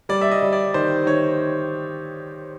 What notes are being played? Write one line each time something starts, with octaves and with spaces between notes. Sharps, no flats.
G3 D5
E5
D#5
G3
D5
D#3 C5
D#3 C#5